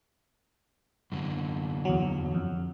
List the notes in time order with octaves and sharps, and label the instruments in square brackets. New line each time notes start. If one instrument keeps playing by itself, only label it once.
[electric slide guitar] F#2 D3
[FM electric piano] E2 F#3
F2